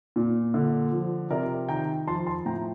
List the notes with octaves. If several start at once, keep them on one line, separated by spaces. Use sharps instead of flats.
A#2
D3
F3
C3 A#4 D5
D#3 G5 A#5
F3 A5 C6
A5 C6
A2 G5 A#5